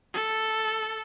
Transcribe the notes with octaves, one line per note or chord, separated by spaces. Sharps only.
A4